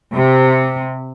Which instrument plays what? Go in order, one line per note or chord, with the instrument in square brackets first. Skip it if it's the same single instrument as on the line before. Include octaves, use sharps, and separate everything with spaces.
[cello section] C3